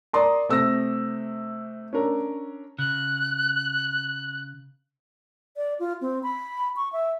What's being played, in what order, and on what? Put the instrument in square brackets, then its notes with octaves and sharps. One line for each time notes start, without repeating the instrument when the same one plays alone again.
[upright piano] A#4 D5 D#6 [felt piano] A#5 C6
[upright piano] C3 C4 A#6 [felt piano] A3 E6
[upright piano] C#4 D4 A#4
[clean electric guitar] C#3 [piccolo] F#6
[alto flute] D5
F4
C4
B5
C#6
E5